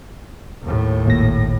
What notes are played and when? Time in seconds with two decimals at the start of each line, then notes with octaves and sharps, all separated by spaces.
0.63 D#2 A2
1.06 G#1 A#2 A#6